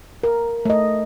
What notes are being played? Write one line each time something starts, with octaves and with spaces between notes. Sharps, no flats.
A#4
A3 D#5